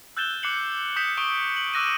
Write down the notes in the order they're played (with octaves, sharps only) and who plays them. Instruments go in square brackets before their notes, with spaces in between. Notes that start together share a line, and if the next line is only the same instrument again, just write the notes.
[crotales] E6 F#6 G6 A6 E7 G7
D6 F#6 C7 C#7 F#7
D6 D#6 G6 B6 C#7 E7
C#6 D#6 D7 G7
F#7
D6 E6 F#6 A#6 D7 D#7